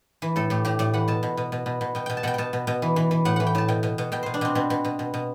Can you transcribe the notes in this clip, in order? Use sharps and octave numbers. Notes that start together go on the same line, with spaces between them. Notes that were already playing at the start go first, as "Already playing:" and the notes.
E3
A2 A4
A2 G4
A2 G4
A2 D5
E3 F#5
B2 A5
B2
B2
B2
B2
B2
B2 G5
B2 G5
A5
B2 F#5 G5
B2 G5 A5
B2
B2
E3
E3
E3
A2 F#5
E3 F#5
G5
A2 A5
B2 G5
B2
B2
B2 G5
B2 C5
D4
B2 C4
B2 C4
B2
B2
B2
B2